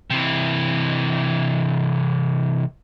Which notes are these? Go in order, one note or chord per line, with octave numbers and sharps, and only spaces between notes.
C3 E3